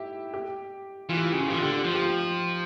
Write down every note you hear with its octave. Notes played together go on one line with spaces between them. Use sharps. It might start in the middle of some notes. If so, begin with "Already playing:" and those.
Already playing: E4 G4
G4
E3 F4
G4
F4
C#3 G4
F4
E3 G4
F4
D3 G4
F4
G4
F3 F4
G4
F4